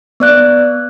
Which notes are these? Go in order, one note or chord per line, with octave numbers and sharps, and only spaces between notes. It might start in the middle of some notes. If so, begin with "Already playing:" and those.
B3 D5 F#6